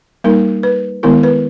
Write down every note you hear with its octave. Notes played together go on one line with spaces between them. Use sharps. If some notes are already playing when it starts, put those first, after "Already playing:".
G3 A#3 D#4 A#4
B4
D#3 G#3 B3 E4 A#4
B4